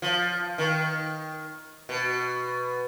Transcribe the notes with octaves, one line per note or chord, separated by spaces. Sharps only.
F3
D#3
B2